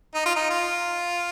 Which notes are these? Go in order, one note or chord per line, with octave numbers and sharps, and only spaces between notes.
D#4
F4
D#4
F4